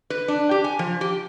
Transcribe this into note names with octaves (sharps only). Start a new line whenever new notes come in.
B4
D4
G4
G#5
F3
G4